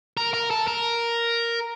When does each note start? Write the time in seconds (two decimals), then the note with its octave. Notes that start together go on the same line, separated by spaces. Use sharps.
0.17 A#4
0.34 A#4
0.51 A4
0.68 A#4